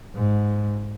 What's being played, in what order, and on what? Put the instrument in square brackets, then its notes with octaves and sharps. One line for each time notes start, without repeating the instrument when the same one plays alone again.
[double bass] G#2